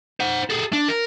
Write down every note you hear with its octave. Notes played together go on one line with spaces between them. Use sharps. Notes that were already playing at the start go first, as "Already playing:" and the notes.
C5 F#5
G#4 A4
D4
A#4